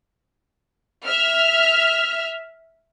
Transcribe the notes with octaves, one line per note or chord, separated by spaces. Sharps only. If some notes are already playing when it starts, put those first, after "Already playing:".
E5 F6